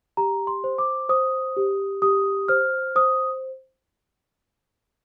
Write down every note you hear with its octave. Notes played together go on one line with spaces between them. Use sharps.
G4 A#5
C6
C5
D6
C5 D#6
G4
G4 D#6
C5 F6
C5 D#6